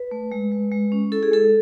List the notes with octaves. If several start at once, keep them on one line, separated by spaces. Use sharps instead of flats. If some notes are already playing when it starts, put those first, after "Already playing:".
Already playing: B4
A3
G#3
G#3
G#3
C#4
E4 A4
G#4
G#3 A4